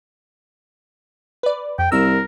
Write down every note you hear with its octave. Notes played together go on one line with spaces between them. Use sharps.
B4 D5
F2 G5
C2 A#4 E6